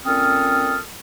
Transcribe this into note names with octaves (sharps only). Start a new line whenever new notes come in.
A#2 C4 C#4 A4 D#6 F6